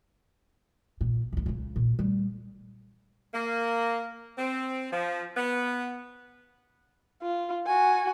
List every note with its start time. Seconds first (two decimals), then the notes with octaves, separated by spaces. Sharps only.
1.01 A#2
1.32 F1 C#2
1.46 C#2 C#3
1.76 A#2
1.99 G3 A3
3.34 A#3
4.38 C4
4.92 F3
5.37 B3
7.22 F4
7.66 F#4 G#5